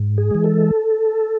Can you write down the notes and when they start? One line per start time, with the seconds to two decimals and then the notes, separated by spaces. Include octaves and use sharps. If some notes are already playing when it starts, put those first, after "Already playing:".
Already playing: G#2
0.18 G#4
0.31 E3 G#3
0.44 A4